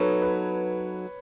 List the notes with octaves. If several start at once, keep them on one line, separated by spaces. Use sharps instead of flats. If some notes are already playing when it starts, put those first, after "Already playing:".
Already playing: F#3 B3 D#4 A4 C#5
B4